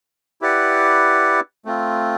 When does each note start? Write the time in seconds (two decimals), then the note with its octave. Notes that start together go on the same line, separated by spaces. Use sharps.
0.41 E4 G4 B4 D5 F#5
1.65 A3 C4 F4